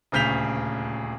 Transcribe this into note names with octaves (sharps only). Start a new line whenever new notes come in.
D#1 D2 C#3 G6 B6 F7